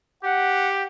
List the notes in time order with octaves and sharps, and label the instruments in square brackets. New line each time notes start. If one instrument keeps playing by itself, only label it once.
[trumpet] G4 [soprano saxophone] F#5